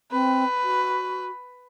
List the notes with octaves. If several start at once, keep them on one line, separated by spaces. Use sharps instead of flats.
C4 B4
F#4